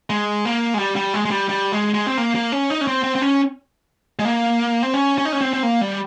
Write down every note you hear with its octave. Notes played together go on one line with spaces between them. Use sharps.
G#3
A#3
G#3
G3
G3
G#3
G#3
G3
G3
G#3
G#3
C4
A#3
A#3
C#4
D#4
C#4
C4
C4
C4
C#4
G#3
A#3
C4
C#4
C#4
D#4
C#4
C4
C4
A#3
G3